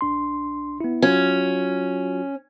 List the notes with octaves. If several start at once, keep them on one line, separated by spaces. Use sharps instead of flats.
A#1 D4 C6
B3 E4
F#3 C#4 F4 F#4